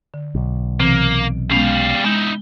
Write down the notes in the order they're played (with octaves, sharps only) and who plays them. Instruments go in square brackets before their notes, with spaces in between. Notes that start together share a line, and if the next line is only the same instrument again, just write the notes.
[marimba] D3
[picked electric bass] B1
[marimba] C3 E3 C4 [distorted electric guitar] A#3
[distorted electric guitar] G3 F5 [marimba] G#3 B3 C#4
[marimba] G#3 [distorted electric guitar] D#4 E4